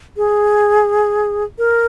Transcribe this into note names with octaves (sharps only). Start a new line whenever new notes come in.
G#4
A#4